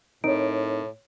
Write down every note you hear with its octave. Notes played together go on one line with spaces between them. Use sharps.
A2 C4 D#4 A#4 C#5 D7